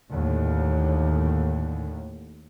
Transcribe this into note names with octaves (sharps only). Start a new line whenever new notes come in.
D#2 A2 D3